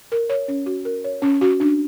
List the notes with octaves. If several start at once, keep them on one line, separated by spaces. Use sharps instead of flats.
A#4
C#5
C#4
F#4
A#4
C#5
C#4
F#4
D4